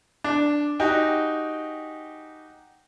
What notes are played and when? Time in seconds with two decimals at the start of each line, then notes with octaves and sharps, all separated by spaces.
0.24 D4
0.80 D#4 F#4 G4 G5 G#5